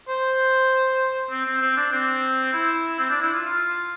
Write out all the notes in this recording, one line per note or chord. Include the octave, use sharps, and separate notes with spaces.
C5
C4
C4
C4
D4
C4
E4
C4
D4
E4
F4
F4